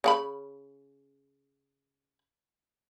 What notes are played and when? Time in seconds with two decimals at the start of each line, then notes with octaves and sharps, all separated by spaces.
0.04 C#3 F#5 B5